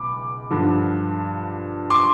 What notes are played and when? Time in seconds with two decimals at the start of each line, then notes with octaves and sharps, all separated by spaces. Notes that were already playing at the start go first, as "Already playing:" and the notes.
Already playing: C#2 B2 B5 D6
0.51 G2 D3 F3
1.90 C6 D6